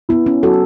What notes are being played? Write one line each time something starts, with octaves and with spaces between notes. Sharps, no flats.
B3 E4
C#4
F#3 A4